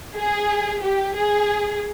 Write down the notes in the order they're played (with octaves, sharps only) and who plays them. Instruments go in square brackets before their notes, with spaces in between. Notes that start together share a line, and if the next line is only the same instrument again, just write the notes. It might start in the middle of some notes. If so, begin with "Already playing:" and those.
[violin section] G#4
G4
G#4